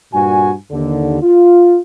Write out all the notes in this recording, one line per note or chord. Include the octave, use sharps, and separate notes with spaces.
G2 A#2 F#4 G#5
D#2 D3
F4